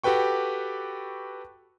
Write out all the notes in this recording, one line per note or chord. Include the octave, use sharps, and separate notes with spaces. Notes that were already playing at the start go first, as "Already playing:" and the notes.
F#4 G4 A4 B4 G5 C#6